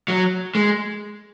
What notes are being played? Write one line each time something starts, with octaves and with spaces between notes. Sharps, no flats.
F#3
G#3